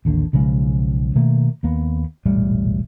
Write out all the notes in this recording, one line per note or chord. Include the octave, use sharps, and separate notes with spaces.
A1 D#2 D3
B1 C#3 F3 G#3
B2 D#3 A3 A#3
D#2 A#3 B3
E1 A#1 A2 G3